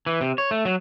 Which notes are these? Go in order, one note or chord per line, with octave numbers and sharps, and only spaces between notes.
E3
C3
C#5
A3
F#3